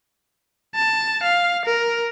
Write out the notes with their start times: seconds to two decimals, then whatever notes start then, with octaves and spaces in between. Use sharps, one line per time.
0.75 A5
1.23 F5
1.65 A#4